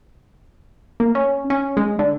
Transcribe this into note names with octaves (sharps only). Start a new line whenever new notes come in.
A#3
C#4
C#4
G#3
D3